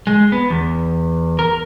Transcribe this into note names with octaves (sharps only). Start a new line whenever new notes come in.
G#3
B3
E2
A#4